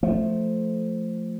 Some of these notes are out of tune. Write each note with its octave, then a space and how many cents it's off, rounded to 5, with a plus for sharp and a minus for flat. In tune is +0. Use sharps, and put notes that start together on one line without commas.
F3 +0 A3 +0